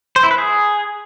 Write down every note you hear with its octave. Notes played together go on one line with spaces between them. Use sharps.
C5
E4
B4
G#4